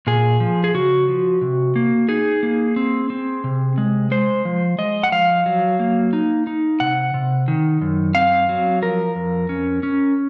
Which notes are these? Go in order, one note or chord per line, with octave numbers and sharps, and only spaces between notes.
A#2 G#4
F3
G#4
C#3 F#4
F3
C3
A#3
D#4 G#4
A#3
C4
C4
C3
G#3
G#3 C5
F3
G#3 D#5
F#5
F3 F5
F#3
A#3
D#4
D#4
C3 F#5
C3
D#3
F#2
C4 F5
F#3
F3 A#4
F2
C#4
C#4